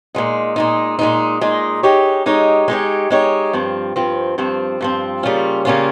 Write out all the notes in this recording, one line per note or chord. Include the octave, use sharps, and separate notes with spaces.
A#2 G#3 D#4
A#2 G#3 D#4
A#2 G#3 D#4
A#2 G#3 D#4
G#3 D#4 G4 C#5
G#3 D#4 G4 C#5
G#3 D#4 G4 C#5
G#3 D#4 G4 C#5
G2 F3 C4
G2 F3 C4
G2 F3 C4
G2 F3 C4
C#3 G3 A#3 C#4 F4
C#3 G3 A#3 C#4 F4